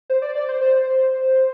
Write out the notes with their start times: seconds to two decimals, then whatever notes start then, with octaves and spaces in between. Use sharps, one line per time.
0.10 C5
0.22 D5
0.35 D5
0.49 C5
0.61 C5